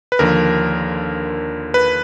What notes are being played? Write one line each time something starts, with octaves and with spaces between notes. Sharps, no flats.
B4
D#2 D3 F3 A#4
B4